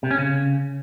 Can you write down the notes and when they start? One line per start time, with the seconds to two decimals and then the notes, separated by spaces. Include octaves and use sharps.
0.03 C3
0.11 C#4
0.18 C#3